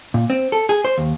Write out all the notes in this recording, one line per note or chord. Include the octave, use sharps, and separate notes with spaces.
A#2
C4
A4
G#4
C5
D#2